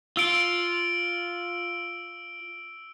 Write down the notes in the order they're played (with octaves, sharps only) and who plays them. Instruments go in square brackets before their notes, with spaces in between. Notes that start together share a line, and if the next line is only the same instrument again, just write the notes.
[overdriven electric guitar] F4 [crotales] E6 D7 G7